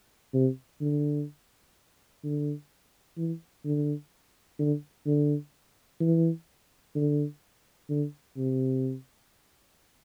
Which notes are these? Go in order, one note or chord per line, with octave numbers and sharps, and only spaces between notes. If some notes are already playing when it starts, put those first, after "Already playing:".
C3
D3
D3
E3
D3
D3
D3
E3
D3
D3
C3